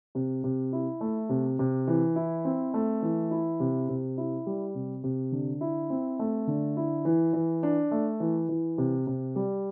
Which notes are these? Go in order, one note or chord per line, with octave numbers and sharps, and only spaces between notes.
C3
C3
E4
A3
C3
C3
E3
E4
C4
A3
E3
E4
C3
C3
E4
G3
C3
C3
D3
E4
C4
A3
D3
E4
E3
E3
D4
A3
E3
E3
C3
C3
G3